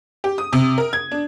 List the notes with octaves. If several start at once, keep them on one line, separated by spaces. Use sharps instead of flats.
G4
D#6
C3
A#4
G#6
D4